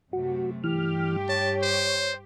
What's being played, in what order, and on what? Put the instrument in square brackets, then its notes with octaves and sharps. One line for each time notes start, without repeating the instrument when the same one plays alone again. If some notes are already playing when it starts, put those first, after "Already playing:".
[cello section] F#2 C3 A3 [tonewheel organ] F#4
[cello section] G2 G4 [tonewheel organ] E3 F6
[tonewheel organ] C#5 [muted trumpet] A5
[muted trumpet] C5